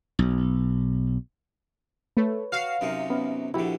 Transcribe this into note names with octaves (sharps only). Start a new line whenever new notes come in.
B1
A3 B4 C#5
F#4 F5
F#2 C3 D#4
B3 C#4
A#1 D3 E4 F#4 G4